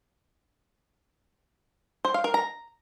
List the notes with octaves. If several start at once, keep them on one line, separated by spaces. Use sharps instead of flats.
C5
F5
A#4
A#5